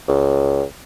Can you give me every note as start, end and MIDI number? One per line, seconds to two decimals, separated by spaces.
0.08 0.63 37